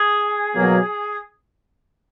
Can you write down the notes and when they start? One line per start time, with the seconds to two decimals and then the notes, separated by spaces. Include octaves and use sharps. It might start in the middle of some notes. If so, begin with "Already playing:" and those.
Already playing: G#4
0.56 B2 F#3 A#3